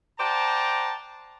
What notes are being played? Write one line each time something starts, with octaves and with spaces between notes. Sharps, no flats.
C5 D5 F#5 G5 A5 A#5